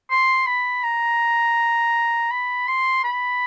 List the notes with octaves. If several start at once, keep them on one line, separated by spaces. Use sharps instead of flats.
C6
B5
A#5
B5
C6
B5